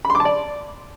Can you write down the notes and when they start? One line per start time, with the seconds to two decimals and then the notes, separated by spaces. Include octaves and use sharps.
0.05 B5
0.10 C6
0.15 D6
0.20 A5
0.25 D5